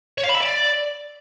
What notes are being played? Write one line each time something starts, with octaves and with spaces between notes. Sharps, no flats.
C#5
F5
B5
E5
D5